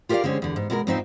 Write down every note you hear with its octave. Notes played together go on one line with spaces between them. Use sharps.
F4 G4 A#4 C#5 D5 F5
D3 G#3 C4 C#4
E2 D3
G#2
B2 G#3 F#4 A4 A#4
E2 G#2 C4 D#4 F4 E5